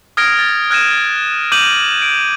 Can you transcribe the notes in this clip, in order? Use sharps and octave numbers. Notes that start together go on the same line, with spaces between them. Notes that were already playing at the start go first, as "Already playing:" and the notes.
D#6 F6 G#6 A#6 D7
A6
F6 F#6 G#6 A#6 D#7 E7
D6 G6 D#7 F#7
D7